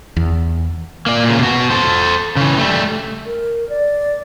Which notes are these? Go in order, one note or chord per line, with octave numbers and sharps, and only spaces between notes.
E2
A#3 D5
A#2 C#3
B2 F#4
A4 C5
C#3 E3
G3 A3
A#4
D5